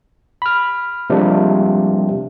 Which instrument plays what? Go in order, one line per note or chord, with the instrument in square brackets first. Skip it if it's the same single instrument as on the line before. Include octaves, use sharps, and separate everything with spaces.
[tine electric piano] B5 F6
C3 F3 G3 G#3 A#3 D4